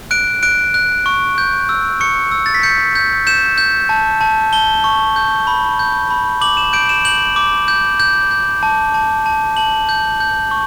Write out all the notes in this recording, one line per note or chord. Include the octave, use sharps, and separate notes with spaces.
F#6 D7
F#6 D7
F#6
C#6
G6
E6
C#6 C#7
E6
A6
B6
G6 C#7
G6
G6 E7
G6
A5
A5
A5 G7
C#6
G6
B5
G6
B5
D6 F#7
E7
G6 D7
E7
G6 F#7
D6
G6
G6
G6
A5
A5
A5
A5 F#7
G6
G6
C#6